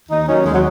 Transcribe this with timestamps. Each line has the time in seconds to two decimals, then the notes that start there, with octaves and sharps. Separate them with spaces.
0.09 D#2 D#4
0.27 D#3 F#3 C#4
0.45 D#2 G#3
0.53 F#3